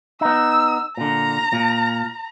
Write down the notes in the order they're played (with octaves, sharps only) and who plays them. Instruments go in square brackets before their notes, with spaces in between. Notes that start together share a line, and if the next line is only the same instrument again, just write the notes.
[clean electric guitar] B3 D#4 [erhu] E6
[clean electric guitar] A#2 D3 [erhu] A#5
[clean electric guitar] A#2